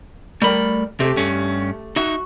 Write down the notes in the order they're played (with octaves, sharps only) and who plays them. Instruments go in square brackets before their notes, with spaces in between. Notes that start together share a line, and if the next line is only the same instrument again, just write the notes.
[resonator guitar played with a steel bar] G3 A#4 [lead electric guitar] A3 B5
[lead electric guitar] C3 [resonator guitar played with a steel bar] A3 G4 A4
[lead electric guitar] G2 C#4
[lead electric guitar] D#4 E5 [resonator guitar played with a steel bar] F#4